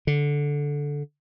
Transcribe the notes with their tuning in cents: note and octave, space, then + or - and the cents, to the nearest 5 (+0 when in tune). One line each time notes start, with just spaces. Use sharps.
D3 -10